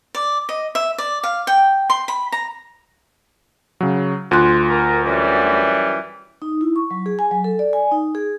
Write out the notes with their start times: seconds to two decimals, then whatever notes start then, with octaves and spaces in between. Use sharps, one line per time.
0.15 D5
0.49 D#5
0.75 E5
0.98 D5
1.23 F5
1.47 G5
1.90 C6
2.08 B5
2.32 A#5
3.81 C#3 F#3
4.31 D2 F4 C6 F#6
4.69 A#4
5.04 F#2 E3 G3
6.42 D#4
6.61 E4
6.76 C#6
6.91 F#3
7.06 G#4
7.19 G#5
7.31 F#3
7.44 A4
7.59 D5
7.73 G#5
7.92 D#4
8.15 G#4